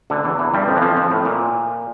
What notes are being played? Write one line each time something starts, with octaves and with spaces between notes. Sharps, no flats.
D2 D3
E2 E3
E2 E3
G2 G3
F2 F3
E3
F2 F3
F2 F3
A2
A#2